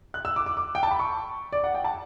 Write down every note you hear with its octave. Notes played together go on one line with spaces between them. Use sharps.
F#6
E6
D6
D6
D6
G5
A5
B5
C#6
D5
F#5
G5
A5